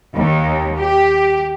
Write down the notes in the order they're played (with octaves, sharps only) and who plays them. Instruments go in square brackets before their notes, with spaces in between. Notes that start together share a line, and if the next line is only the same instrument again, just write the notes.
[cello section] D#2
G4